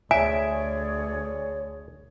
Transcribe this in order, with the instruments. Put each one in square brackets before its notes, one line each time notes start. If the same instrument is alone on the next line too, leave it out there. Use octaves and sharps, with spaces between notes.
[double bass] D2 [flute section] G#4 C#5 D5 [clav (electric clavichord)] E5 [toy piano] G#5